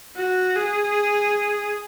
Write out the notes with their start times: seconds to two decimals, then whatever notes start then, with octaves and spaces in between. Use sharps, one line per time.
0.16 F#4
0.56 G#4